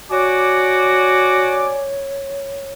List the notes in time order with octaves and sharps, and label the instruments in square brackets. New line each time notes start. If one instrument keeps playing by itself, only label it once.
[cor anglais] F#4 [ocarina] C#5 [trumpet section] D5 G#5 D6